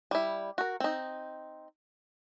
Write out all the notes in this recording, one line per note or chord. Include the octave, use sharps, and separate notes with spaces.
G3 E4
F#4 A#4
C4 D#4